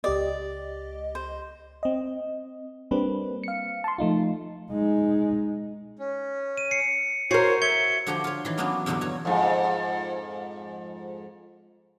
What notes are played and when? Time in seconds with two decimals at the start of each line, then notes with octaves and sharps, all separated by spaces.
0.04 C#2 G4 D5 D#5
1.15 C5
1.83 C4 D#5
2.91 G3 A#3 C4 D4 B4
3.44 F5 C#7
3.84 A5 C6
3.98 F3 A3 D#4 F4
4.71 G#3 D#4
5.99 C#4
6.57 D#7
6.71 C7 C#7
7.31 F#4 A#4 C5 C#5 C7
7.62 E5 G#6 C#7 G7
8.07 D3 F3 F#4 G4 G5 A#5
8.24 F4 C#5
8.45 D#3 E3
8.58 F#3 A#3 B3 C#4 D4 F#4
8.86 E2 G2 B2 D3 F#3
9.01 F#4 C#5
9.25 F2 G#2